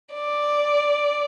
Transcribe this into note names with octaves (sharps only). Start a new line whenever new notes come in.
D5